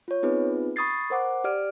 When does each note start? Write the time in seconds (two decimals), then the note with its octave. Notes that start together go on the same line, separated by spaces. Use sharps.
0.08 F4 C#5
0.23 B3 C4 D#4 F4 G#4 B4
0.76 B5 C#6 D#6 G#6 A6 C7
1.10 A#4 C5 F#5 D6
1.44 G4 D5 F6 D7